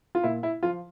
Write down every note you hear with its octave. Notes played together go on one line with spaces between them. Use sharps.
F4
A#2 E4
E4
F3 F4